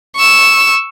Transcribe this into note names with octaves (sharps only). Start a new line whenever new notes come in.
C#6 E6